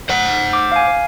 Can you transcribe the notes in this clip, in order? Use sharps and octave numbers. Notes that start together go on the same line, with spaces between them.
C5 F#5
D6
F5 G#5